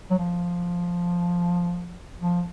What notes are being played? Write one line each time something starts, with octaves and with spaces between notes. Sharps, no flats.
F#3
F3
F3